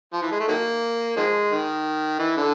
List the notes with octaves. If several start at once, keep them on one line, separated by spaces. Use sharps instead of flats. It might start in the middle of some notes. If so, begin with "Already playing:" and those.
F3
E3
G#3
A3
D#3 F#3 A#3
D#3 F3 G#3
D#3
E3
D3